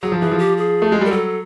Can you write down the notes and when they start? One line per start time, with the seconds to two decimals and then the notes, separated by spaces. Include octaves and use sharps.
0.02 F#3 G#4
0.12 F3
0.21 E3 G#4
0.32 F3
0.38 G4
0.57 G#4
0.82 A3
0.92 G#3
1.01 G3 A#4
1.11 F#3 A4